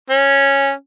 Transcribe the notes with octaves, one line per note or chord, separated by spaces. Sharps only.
C#4